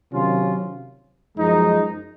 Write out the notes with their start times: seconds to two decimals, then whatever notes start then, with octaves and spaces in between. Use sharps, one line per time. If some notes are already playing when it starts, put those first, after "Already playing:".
0.13 C3 D#3 F#3 C#4 F4
1.37 F#2 F3 G#3 D#4